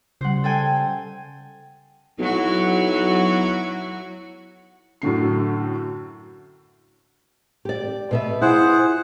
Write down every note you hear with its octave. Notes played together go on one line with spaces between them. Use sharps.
C#3 G3 C5 F#5
A4 G5 G#5
B1 F#3 E4 F#4
F#2 A2 D3 C7
G4 D5
B2 B3 E5
E4 F4 G#4 C5 F#5